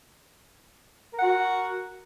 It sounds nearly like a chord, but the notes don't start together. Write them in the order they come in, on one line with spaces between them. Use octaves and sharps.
A#4 F#5 F#4